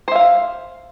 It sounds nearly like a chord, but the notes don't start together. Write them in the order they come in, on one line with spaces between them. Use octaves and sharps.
C5 E5 F5